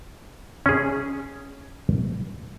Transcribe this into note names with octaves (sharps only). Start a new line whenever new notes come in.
C#4 G#4